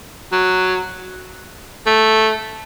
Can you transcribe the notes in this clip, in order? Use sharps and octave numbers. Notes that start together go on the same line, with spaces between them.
F#3
A3